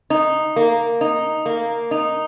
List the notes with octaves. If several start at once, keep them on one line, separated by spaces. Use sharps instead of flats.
D#4
A#3
D#4
A#3
D#4